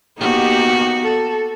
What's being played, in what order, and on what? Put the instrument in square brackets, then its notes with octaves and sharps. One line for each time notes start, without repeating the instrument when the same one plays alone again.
[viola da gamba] A#3 B3 F#4 [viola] D#4 G4
[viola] A4